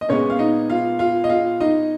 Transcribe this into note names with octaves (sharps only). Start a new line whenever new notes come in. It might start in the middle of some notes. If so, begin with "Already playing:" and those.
D#5
A#2 G#3 B3 C#4 C#5
F5
D#4 D#5
F4 F5
F4 F5
D#5
F4 F5
D#4 D#5